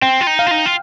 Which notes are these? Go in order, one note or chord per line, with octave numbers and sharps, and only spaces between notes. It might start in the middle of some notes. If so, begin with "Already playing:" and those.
C4 G5
F4
D#4
F5
F4
D#4
F4